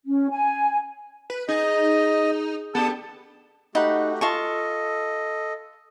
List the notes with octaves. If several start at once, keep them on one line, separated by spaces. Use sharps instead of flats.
C#4
G#5
B4
D#4 G#4 D#5
B3 D4 G4 A4 A5
A3 D#4 F#4 G4 F#5 B5
F4 A4 D#5 A5 C#6